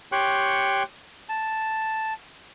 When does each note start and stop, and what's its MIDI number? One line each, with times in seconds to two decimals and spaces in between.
0.12 0.83 67
0.12 0.83 73
0.12 0.83 79
0.12 0.83 84
0.12 0.83 85
0.12 0.83 90
1.29 2.13 81